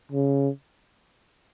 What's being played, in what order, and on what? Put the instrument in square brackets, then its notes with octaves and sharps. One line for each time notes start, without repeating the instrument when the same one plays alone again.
[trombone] C#3